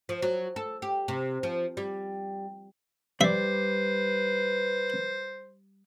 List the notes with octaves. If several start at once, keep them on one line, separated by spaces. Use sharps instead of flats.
F3
F#3
A4
G4
C3
F3
G3
G3 B4 C5 D5 E5